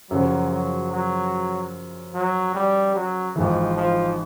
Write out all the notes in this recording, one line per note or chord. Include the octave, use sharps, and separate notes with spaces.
F#2 C#3 F3 F#3
F#3
F#3
F#3
G3
F#3
G#1 G#2 E3 F3
F3